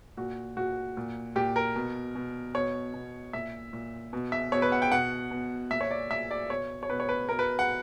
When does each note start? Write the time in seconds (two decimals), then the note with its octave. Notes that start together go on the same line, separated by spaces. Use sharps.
0.17 A#2 F#4
0.57 A#2 F#4
0.97 A#2
1.36 A#2 G4
1.56 A#4
1.76 B2
2.15 B2
2.54 B2 C#5
2.94 B2
3.33 A#2 E5
3.73 A#2
4.13 B2
4.32 E5
4.52 B2 C#5
4.62 B4
4.72 F#5
4.82 G5
4.92 B2 F#5
5.31 B2
5.70 A#2 E5
5.81 C#5
5.91 D5
6.10 A#2 E5
6.31 D5
6.50 B2 C#5
6.83 C#5
6.90 B2 B4
7.00 C#5
7.09 B4
7.29 B2 A#4
7.39 B4
7.59 F#5